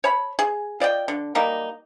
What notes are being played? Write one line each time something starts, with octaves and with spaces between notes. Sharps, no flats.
C#5 A5 B5
G#4
F4 D5 D#5 G5
D3
F#3 G3 A#3 D#4